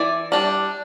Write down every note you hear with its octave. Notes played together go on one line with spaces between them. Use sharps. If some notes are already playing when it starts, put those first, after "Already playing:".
Already playing: E3 D5
G3 D4